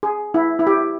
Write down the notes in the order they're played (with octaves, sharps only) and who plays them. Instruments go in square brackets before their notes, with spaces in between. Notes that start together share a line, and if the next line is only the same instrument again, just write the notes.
[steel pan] G#4
E4
E4
G4